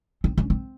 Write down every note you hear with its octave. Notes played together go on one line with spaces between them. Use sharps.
C4
C#4
C4